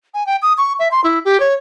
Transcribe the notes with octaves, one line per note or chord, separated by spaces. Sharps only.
G#5
G5
D#6
C#6
E5
C6
E4
G4
C#5